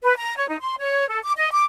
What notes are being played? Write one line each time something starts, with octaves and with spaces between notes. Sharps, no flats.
B4
A#5
C#5
D#4
C6
C#5
A4
D6
D#5
D6